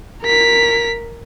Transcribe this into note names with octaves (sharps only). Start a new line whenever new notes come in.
A#4 B6